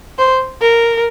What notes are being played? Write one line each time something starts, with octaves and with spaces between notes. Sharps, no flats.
C5
A#4